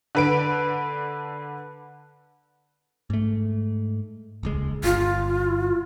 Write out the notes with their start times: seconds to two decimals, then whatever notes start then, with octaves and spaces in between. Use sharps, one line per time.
0.15 D3 B4 D7
3.10 G#2 A3
4.43 D#1 C#2 G#3
4.84 G1 F4